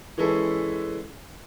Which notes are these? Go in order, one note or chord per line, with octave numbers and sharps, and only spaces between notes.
E3 G#3 C#4 E4 A4